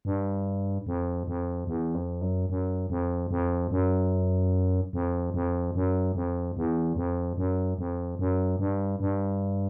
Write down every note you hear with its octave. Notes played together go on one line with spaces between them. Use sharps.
G2
F2
F2
E2
F2
F#2
F#2
F2
F2
F#2
F2
F2
F#2
F2
E2
F2
F#2
F2
F#2
G2
G2